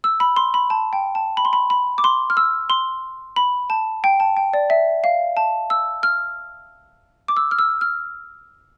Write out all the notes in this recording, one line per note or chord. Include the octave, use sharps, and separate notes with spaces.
E6
B5
C6
B5
A5
G5
A5
B5
C6
B5
B5
D6
C6
F6
E6
C6
B5
A5
G5
A5
G5
D5
E5
F5
A5
E6
F6
D6
E6
F6
E6
F6